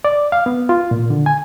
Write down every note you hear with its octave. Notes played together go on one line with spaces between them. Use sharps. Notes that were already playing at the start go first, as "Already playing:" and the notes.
D5
F5
B3
F4
A#2
D3
G#5